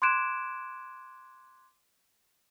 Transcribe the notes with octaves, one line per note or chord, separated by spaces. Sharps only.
C6 D6 F#6 G#6 D7 E7